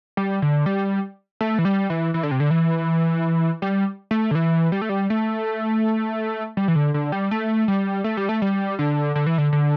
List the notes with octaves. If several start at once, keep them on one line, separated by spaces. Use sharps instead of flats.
G3
D3
G3
A3
E3
G3
E3
E3
D3
C3
D3
E3
G3
A3
D3
E3
G3
A3
G3
A3
G3
E3
D3
D3
G3
A3
G3
A3
G3
A3
G3
D3
D3
E3
D3
D3